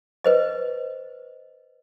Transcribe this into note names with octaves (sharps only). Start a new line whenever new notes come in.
B4 C5 D#5